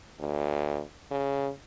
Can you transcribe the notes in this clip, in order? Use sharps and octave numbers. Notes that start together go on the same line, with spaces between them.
D2
C#3